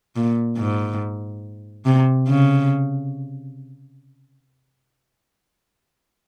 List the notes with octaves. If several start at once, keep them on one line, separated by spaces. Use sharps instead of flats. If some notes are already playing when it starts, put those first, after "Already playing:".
A#2
G#2
C3
C#3